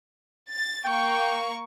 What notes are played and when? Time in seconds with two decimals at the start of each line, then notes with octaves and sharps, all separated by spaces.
0.49 A6
0.85 A#3 G5 C#6